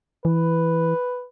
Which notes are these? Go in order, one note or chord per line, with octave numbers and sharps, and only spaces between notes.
E3 B4